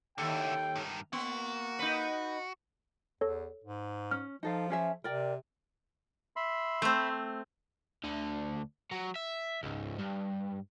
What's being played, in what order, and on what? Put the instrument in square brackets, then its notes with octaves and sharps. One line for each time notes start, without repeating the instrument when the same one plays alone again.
[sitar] D#2 A4 [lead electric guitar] D3 E4 [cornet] G5
[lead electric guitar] G2 D#3
[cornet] A#3 [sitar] B3 [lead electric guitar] F#4
[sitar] D#4 B4
[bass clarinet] E2 [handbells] A4 C#5
[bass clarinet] G#2
[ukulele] C#4 [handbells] F6
[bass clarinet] F3 [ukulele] D#4 A4 F5
[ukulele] C#4 G#4 E5
[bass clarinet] C3 [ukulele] A#4 D5 G5
[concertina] E5 B5 C6
[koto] A3 C4
[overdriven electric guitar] D2 D3
F#3
E5
C#2 G#2
G2